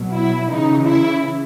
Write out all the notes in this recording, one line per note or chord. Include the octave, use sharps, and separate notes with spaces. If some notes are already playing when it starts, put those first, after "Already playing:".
Already playing: B2 F#3
E4
C#3 E3 D#4
E4